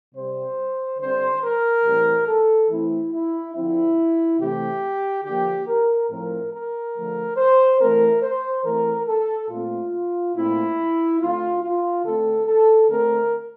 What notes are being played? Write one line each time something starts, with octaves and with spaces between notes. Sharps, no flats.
C3 G3 C4 C5
D3 G3 C4 C5
A#4
A2 E3 G3 C4
A4
E3 A3 C4 E4
E4
D3 F3 C4 E4
C3 E3 A3 C4 G4
D3 F3 A#3 G4
A#4
A2 F3 C4 A#4
A#4
D3 F3 A3
C5
E3 A3 C4 A#4
C5
E3 A3 C4 A#4
A4
A#2 A3 C4 F4
A#2 A3 C4 E4
D3 A3 C4 F4
F4
D3 A3 C4 A4
A4
D3 A3 C4 A#4